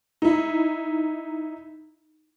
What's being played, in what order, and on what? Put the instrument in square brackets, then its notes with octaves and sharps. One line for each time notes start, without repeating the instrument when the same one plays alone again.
[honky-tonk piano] D#4 E4